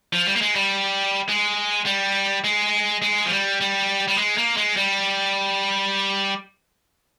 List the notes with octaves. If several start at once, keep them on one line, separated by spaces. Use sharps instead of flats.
F3
G3
A#3
G#3
G3
G#3
G3
G#3
G#3
F3
G3
G3
G3
G#3
A#3
G#3
G3